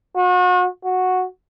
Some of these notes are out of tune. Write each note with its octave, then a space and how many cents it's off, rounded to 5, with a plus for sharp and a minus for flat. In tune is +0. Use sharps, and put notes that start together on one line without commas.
F#4 -40
F#4 -5